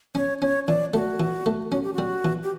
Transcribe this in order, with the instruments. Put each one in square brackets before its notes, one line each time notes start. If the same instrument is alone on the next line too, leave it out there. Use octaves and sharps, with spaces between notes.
[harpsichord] C#4 [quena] C#5
[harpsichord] C#4 [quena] C#5
[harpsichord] E3 [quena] D5
[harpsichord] A3 [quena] F#4
[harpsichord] E3
A3
[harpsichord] C#4 [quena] F#4
[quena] G4
[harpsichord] G3 [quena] F#4
[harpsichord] E3
[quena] G4